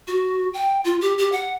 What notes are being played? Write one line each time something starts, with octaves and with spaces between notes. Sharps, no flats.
F#4
G5
F4
G4
G4
F#5